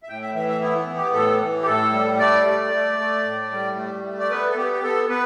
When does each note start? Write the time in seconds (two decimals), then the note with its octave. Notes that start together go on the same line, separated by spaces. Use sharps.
0.03 E5
0.09 A2 G5
0.21 E5
0.34 E3 E5
0.49 E5
0.61 B3 E4
0.79 E4
0.87 B3
0.96 G4
1.13 A2 A4
1.41 E3
1.62 G4
1.66 A2 A4
1.92 G3
2.19 A3 D5
2.46 A3
2.72 A3
2.98 A3
3.24 A2
3.52 G3
3.77 A3
4.05 A3
4.19 D5
4.30 B3 B4
4.50 A4
4.56 B3 G4
4.72 G4
4.83 B3 A4
5.09 B3 B4